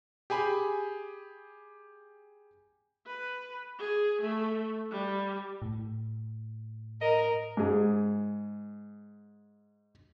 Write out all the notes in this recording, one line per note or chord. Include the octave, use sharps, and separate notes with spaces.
G4 G#4 G#5 B5
B4
G#4
A3
G3
A2
A#4 D#5
G#2 G#4